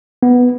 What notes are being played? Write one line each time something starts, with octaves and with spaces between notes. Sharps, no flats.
B3